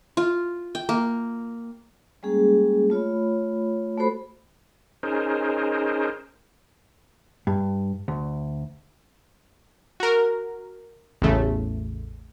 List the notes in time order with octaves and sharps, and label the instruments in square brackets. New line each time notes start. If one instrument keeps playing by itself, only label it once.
[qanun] F4
G5
A#3
[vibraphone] G3 G#3 A#3 C#4 G#4
A3 F4 C#5 B5
A3 F#4 A4 C5 B5
[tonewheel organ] C#4 D#4 G#4 A#4 C5
[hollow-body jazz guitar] G2
D2
[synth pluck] F#4 A#4
A1 E2 C#3 A3